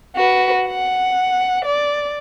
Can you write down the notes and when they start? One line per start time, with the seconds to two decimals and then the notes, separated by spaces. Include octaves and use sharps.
0.16 F#4 B4
0.67 F#5
1.65 D5